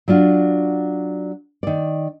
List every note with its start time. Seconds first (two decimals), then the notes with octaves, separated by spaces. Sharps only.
0.08 F#3 D4 F4 F#4
1.63 D#3 D5